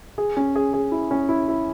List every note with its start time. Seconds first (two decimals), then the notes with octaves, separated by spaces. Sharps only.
0.18 G#4
0.37 C#4
0.56 G#4
0.74 G#4
0.91 E4
1.11 C#4
1.29 E4
1.48 E4